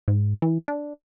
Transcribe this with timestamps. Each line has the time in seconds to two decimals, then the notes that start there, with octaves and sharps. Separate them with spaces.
0.08 G#2
0.42 E3
0.68 D4